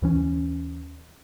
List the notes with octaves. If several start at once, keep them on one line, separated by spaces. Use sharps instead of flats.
D#2 E3 C#4